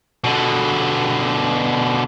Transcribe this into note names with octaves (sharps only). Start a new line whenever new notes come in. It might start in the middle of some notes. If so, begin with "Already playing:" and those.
B2 D3